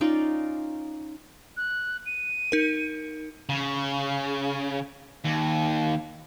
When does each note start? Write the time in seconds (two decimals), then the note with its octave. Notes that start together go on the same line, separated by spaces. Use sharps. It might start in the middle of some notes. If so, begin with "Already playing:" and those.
0.01 C#4 D#4 F4 D5
1.57 F#6
2.06 D#7
2.52 D#4 A#4
3.49 C#3
5.24 D#2